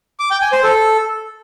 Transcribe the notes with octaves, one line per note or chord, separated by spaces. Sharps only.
D6
G5
G#5
C5
A4